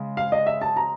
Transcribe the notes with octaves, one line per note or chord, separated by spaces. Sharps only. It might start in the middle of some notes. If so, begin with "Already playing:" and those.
Already playing: C#3 G#3
F5
D#5
E5
A5
A#5